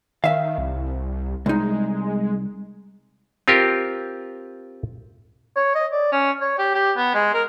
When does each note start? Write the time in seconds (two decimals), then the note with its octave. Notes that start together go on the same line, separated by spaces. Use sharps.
0.24 D#3 E5 F5
0.58 C2
1.46 C2 G#3 D#4
3.48 C4 F4 G4 A#4
5.56 C#5
5.75 D#5
5.92 D5
6.12 C#4
6.41 C#5
6.59 G4
6.74 G4
6.97 B3
7.14 G#3
7.34 A#4